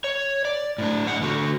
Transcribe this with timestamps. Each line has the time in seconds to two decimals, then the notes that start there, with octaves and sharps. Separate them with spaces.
0.04 C#5
0.45 D5
0.78 A2 D4
1.07 A2 F#5
1.22 D3 F#4